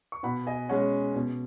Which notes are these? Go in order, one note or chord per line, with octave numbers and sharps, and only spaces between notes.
C#6
B2 F#5 B5
D#5 G#5
G#3 C#4 C#5 F#5
B2